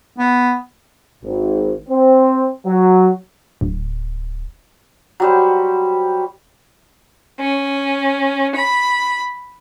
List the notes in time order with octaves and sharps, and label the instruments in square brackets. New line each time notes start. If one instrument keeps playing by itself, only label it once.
[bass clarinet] B3
[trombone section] G#1
C4
F#3
[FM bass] D1
[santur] F#3 G3 C5
[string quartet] C#4
B5